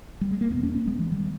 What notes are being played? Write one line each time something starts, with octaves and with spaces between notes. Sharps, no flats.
G3
G#3
A#3
E2 B2 B3
A#3 C#4
A#3 C#4
G#3 B3
E3 G#3
D#3 G3